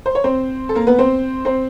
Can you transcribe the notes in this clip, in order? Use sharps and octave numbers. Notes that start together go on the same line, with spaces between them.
C5
C#5
C4 C5
A4
A#3 A#4
B3 B4
C4 C5
C4 C5